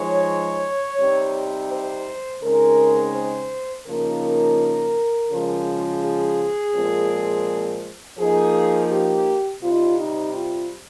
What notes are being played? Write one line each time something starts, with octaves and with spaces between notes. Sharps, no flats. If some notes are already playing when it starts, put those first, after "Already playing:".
Already playing: F3 G#3 D#4 C#5
C3 G3 C4 D#4
C5
C#3 G#3 C4 D#4 A#4
C5
C#3 F3 A#3 D#4 A#4
C#3 F3 G#3
G#4
A#2 F3 G#3 C4
F3 A#3 D#4 G#4
G4
C3 G3 C4 D#4 F4
D#4
F4